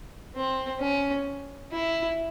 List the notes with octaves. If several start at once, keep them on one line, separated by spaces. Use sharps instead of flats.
C4
C#4
E4